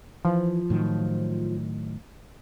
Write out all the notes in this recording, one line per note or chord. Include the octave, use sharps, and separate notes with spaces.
E3 F3
A2 D#3 F#3